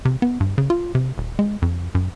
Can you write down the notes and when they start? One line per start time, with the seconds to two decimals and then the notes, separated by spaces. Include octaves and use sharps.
0.05 C3
0.22 B3
0.40 G2
0.58 C#3
0.70 F4
0.95 C3
1.18 D#1
1.39 G#3
1.62 F2
1.95 F#2